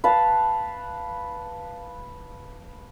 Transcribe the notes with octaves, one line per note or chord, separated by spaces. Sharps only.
B4 F5 A5